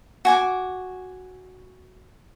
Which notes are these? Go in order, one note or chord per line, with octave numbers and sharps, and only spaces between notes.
F#4 G#5 D6